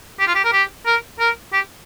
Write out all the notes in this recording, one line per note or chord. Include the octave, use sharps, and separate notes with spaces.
G4
F4
G4
A#4
G4
A#4
A#4
G4